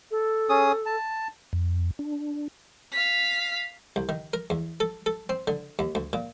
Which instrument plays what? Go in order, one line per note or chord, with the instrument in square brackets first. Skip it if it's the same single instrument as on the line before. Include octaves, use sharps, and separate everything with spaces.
[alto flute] A4
[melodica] C#4 G#4 D#6
A5
[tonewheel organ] F2
D4
[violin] F5 B6
[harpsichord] C2
D#3
A#4
E2
A4
A4
C4
D3
D#2
D2
A#2